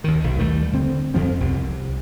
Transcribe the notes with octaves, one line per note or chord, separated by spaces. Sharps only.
D#2 D#3
B1
D#2 G3 A3
D3 C4
F2 F3 C4
C2